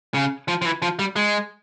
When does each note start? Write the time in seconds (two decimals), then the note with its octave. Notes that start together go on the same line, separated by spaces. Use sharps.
0.14 C#3
0.48 F3
0.62 F3
0.65 E3
0.82 F3
0.99 G3
1.16 G#3